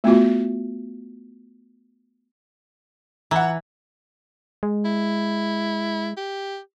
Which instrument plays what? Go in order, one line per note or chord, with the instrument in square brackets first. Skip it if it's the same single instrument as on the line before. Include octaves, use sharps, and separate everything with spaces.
[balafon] A3 B3 F4 F#4
[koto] E3 [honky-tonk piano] F#5 A#5
[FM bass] G#3
[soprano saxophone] E4
G4